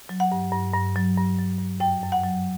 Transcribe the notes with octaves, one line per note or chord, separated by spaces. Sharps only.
F#3
F#5
G2
G2
G2
F#3
G2
F#3
G2
F#2 G5
F#2
F#5
F#3